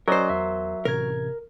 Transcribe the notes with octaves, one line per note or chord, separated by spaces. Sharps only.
F#3 C#4 A#4 C5 D5 D#5
E2 E5
A1 C3 A#4 G#6